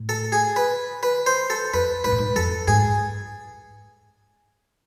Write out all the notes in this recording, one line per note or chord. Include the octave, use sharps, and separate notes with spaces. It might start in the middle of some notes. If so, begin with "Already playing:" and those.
Already playing: A2
A4
G#4
B4
B4
C5
A4
F2 B4
G#2 B4
A2
G#2
F2 A4
G#2 G#4